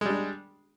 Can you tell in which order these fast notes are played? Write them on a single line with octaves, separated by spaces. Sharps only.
G#3 G3 D4